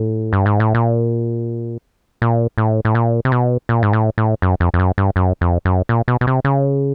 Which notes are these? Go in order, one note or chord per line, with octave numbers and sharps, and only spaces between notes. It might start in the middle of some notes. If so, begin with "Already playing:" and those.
Already playing: A2
G2
G#2
A2
A#2
A#2
A2
A2
A#2
C3
B2
A#2
G#2
A2
A2
F#2
F2
F2
F#2
G2
F#2
F2
F#2
A#2
B2
B2
C3
C#3